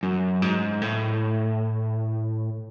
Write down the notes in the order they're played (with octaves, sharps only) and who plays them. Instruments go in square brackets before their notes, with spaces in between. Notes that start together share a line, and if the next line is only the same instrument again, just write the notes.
[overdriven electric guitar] F#2
G#2
A2